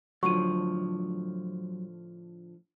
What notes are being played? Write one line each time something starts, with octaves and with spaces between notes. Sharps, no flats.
A2 D3 F3 F#3 C#6 D#7